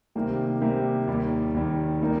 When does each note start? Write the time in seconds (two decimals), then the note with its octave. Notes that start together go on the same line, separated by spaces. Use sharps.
0.15 C3 D#3 G3 A#3 G4
0.61 C3 D#3 G3 A#3 G4
1.07 D#2 D#3 G3
1.54 D#2 D#3 G3
2.01 G3 A#3 D#4 A#4